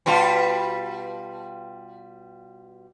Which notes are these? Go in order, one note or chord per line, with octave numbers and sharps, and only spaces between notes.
B2 G3 F4